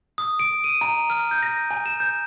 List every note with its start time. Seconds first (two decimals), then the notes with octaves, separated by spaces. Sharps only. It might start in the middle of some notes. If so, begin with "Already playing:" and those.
0.18 D#6
0.39 D7
0.64 D#7
0.81 A#5
1.10 F6
1.31 G6
1.43 A#6
1.71 G#5
1.86 E7
2.00 G6